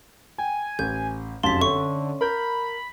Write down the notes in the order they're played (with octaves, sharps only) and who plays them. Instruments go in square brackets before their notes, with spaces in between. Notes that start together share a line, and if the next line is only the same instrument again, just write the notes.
[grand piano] G5 [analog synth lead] G#5
[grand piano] A1 [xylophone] G6
[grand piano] F1 F#2 F5 [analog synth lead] A5 [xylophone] C6 B6
[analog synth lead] D3 [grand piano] C#4 [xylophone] E5 C#6
[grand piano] A#4 G6 [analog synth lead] B5